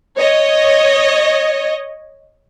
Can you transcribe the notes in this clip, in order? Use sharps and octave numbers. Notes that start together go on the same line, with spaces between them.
C#5 D#5